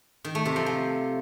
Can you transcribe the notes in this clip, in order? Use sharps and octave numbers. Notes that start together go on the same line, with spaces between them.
D#3
A3
C3
F3
F3